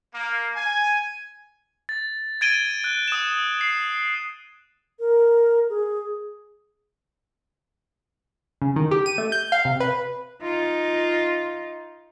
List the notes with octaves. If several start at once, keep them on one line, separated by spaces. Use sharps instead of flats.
A#3
G#5
A6
G#6 A6 D7 D#7 G7
F#6
D#6 E7
C7
A#4
G#4
C#3
D#3
G4
D#7
A3
G6
F5
C3
B4
D#4 F4